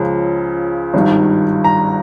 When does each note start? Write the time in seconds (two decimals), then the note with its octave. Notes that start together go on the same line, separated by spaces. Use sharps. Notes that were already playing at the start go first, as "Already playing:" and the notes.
Already playing: C#2 C#3 F3
0.94 G#1 G2 D#3
1.64 A#5